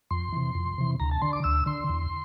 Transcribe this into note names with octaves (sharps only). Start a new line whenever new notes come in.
F2 C6
C3 E3
F2
C3 E3
D2 A#5
A5
D3 C6
D6
D2 E6
D3 C6
E2